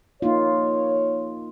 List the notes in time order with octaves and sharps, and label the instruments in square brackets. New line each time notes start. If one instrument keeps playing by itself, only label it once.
[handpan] A#3 D#4 F4 [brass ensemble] C#5